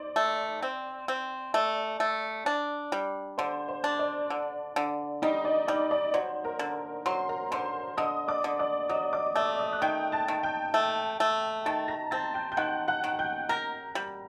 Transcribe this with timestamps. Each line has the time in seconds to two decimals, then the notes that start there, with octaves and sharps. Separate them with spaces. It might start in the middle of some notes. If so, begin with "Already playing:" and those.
Already playing: D#4 C5 D5
0.16 A3
0.62 C4
1.08 C4
1.54 A3 D5
2.00 A3
2.46 D4
2.92 G3
3.38 D3 C5
3.68 C5
3.84 D4
3.99 D5
4.30 D3
4.76 D3
5.22 G3 D#4 D#5
5.45 D5
5.68 G3 D5
5.91 D5
6.13 F#3 C5
6.44 A#4 A#5
6.59 D3
7.06 F#3 C5 C6
7.29 A#4 A#5
7.51 D3 C5 C6
7.97 D3 D#5 D#6
8.28 D5 D6
8.44 D3
8.59 D5 D6
8.89 F#3 D#5 D#6
9.13 D5 D6
9.36 A3 D5 D6
9.58 D#5 D#6
9.73 F#6
9.82 D#3 G5 G6
10.12 A5 A6
10.28 D#3
10.43 G5 G6
10.74 A3
11.20 A3
11.66 D#3 A5 A6
11.88 A#5 A#6
12.11 C4 A5 A6
12.34 G5 G6
12.52 G6
12.57 D#3 F#5 F#6
12.88 F#5 F#6
13.04 D#3
13.19 G5 G6
13.49 A#4 A#5 A#6
13.95 G3